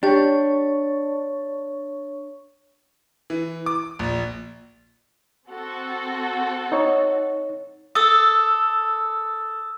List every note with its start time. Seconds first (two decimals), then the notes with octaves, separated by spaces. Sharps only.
0.03 D4 G4 C#5 C#6
3.30 E3
3.66 D6
3.99 A#1
5.50 C4 F#4 A4
6.72 D#4 C#5
7.95 A4 D#6 E6